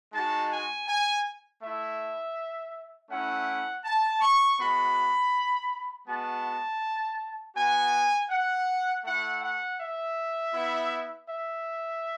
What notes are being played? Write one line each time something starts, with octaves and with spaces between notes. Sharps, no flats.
G#3 D#4 F#4 A5
G#5
G#5
A3 E4 E5
A3 C#4 E4 F#5
A5
C#6
G#3 B3 F#4 B5
G#3 B3 F#4 A5
B3 F#4 G#5
F#5
A3 E4 F#5
F#5
E5
B3 E4
E5